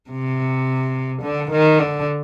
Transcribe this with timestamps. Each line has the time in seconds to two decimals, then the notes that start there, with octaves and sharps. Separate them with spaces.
0.10 C3
1.22 D3
1.51 D#3
1.79 D3